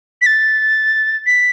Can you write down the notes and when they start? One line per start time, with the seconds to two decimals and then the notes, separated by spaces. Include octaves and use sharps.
0.22 B6
0.26 A6
1.26 B6